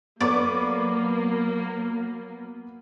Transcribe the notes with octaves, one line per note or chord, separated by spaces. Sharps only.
F#3 A#3 B3 D5 C#6 D6